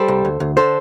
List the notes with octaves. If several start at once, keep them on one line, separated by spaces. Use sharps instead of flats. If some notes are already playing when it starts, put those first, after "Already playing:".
Already playing: G3 A4 C5
C2
D2
D2
D3 A4 C5